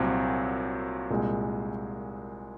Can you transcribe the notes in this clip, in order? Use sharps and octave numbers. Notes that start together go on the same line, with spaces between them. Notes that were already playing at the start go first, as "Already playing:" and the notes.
Already playing: C2 A#2 F#3 C4
C2 A#2 G#3